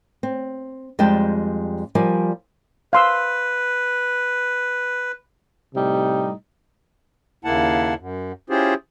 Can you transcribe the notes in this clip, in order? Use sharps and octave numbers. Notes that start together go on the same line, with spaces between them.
C4
F2 G3 G#3 D5 G5 A5
F3 G3 A#4 D5 G#5
B4 F5 C6 E6
A2 C3 G3 D#4
D#2 C#3 A#3 E4 F#5 A5
F#2
C#4 E4 F4 G4 G#4 C5